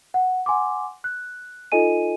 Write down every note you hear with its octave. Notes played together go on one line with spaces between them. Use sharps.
F#5
F#5 G#5 C6 D6
F#6
D#4 F4 A4 D#5 G#5 D#7